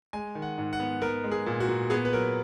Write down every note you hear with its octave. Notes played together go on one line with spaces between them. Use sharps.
G#3 G#5
D#3
F#5
G#2
F#5
B3
B3 A#4
G#3
G#4
A#2
F#4
A#2
B3 G#4
B4
F#3 A#4